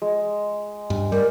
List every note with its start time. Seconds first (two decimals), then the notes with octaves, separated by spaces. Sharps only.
0.02 G#3
0.90 G2
1.12 G3 A#4